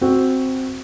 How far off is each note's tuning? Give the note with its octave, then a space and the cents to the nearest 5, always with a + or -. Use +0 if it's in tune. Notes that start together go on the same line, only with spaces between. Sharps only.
C4 +0 F#4 +0